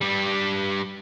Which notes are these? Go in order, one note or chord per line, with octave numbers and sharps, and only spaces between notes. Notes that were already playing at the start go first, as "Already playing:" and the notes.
G2 G3